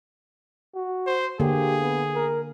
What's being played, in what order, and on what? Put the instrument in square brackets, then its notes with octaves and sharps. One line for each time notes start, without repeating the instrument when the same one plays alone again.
[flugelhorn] F#4
[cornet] C5
[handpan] D3 A#3 [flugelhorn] G4 [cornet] G#4
[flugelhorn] B3
A#4